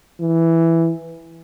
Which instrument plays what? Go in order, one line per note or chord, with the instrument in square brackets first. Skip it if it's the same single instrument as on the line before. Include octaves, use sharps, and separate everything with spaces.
[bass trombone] E3